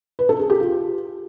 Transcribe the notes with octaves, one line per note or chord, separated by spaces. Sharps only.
B4
A4
G#4
G4
F4